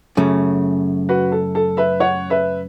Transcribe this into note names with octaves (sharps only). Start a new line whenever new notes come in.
F#2 C#3 A3
F#4 B4
A4
A4
B4 E5
C#5 F#5
B4 E5